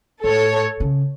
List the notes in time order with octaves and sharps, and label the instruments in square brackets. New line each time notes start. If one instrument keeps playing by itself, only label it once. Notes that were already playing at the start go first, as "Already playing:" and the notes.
[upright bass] A2 [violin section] A4 C#5
[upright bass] C#3